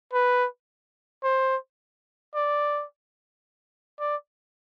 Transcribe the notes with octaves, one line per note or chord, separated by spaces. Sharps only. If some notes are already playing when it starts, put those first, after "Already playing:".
B4
C5
D5
D5